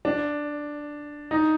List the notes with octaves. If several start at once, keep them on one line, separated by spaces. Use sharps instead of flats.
D4
D#4